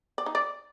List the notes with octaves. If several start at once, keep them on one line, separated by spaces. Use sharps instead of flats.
D5
D#4
D5